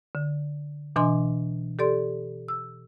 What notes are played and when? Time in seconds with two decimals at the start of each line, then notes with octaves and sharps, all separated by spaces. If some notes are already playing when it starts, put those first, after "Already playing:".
0.15 D3
0.96 B2 E3 D4 D#5 G#5 C6
1.79 G4 A4 D5 C6
2.48 E6